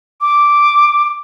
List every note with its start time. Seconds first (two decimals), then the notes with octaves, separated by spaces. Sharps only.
0.21 D6